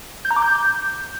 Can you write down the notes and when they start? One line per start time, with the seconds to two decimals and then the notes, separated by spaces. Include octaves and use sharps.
0.25 G6
0.31 A#5
0.36 D6
0.42 G6